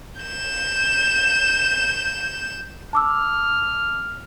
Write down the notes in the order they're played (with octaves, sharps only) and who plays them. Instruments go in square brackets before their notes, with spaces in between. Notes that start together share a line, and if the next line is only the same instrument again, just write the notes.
[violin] G6 E7
[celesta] A5 D6 E6 [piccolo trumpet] F6